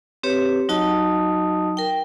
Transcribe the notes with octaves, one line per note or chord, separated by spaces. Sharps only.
C4 G4 B4 C#5
F#3 D#4 F#4 D#5 A5 D#6
A#4 G5